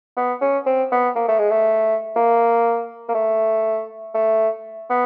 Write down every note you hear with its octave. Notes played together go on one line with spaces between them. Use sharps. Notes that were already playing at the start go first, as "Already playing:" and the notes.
B3
C#4
C4
B3
A#3
A3
G#3
A3
A#3
A#3
A3
A3
B3